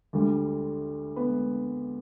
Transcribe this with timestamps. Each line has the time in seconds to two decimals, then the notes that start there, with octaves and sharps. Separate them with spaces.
0.13 D2 D3 G3
1.16 B3 B4